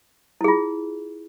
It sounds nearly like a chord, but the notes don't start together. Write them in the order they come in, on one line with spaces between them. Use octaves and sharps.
E4 G#4 F4